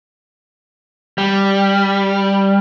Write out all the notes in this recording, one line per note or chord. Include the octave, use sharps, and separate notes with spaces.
G3